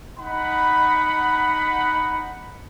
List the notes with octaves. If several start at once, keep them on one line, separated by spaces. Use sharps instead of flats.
D#4 F#5 B5